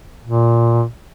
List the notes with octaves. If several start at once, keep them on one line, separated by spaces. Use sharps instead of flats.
A#2